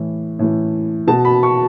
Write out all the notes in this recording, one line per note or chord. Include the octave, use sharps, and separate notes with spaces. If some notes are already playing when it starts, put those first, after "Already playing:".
Already playing: A2 E3
A2 E3
B2 A5
B5
C#6